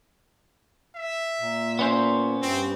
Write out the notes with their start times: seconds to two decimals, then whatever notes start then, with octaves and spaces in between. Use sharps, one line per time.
0.96 E5
1.39 A#2
1.79 B3 C#4 C5
2.42 G2 C4